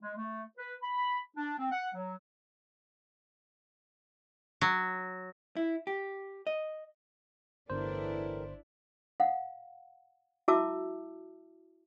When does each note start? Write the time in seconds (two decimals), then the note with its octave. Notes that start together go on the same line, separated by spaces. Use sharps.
0.03 G#3
0.17 A3
0.58 B4
0.83 B5
1.37 D4
1.59 C4
1.71 F#5
1.95 F#3
4.61 F#3
5.57 E4
5.87 G4
6.47 D#5
7.70 G1 A2 E3 D4 E4 A#4 C5
9.20 F5 F#5
10.48 E4 F#4 E5 A5 D6 E6